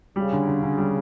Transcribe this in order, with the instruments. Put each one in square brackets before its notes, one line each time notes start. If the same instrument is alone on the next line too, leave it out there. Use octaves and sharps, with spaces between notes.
[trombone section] C#3 [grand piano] G3
[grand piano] D3
D3
D3
G3